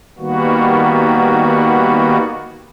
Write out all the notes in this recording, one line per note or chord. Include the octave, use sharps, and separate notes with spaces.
D#3 G3 A#3 B3 F#4